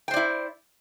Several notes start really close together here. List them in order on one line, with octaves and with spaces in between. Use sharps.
G5 C5 D5 E4